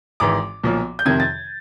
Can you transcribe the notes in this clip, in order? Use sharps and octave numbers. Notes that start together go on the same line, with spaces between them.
G#1 G#2 E3 D6
B1 A#2 F3
G6
F2 C3 D#3 G#6
A6